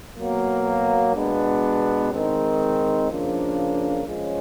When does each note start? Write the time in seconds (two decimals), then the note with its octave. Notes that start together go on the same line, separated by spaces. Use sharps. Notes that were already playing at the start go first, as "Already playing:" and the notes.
0.17 B2 F#3 A#3
1.14 B2 G#3 B3 D4
2.11 D#3 G#3 C4 D#4
3.08 C#3 F3 A#3 D4
4.05 F3 G#3 C#4